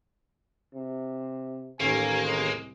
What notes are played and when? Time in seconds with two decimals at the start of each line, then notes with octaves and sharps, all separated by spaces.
0.74 C3
1.80 A1 D#2 A#3 G#5
2.22 C2 G#3